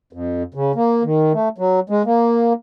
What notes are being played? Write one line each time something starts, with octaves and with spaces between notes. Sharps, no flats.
F2
C#3
A#3
D#3
A3
F#3
G#3
A#3